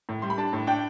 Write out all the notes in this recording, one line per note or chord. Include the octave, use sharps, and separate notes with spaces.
A2
G3 C6
B5
D4 A5
A2
D4 G5